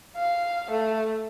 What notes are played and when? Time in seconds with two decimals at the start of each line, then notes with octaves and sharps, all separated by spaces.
0.16 F5
0.70 A3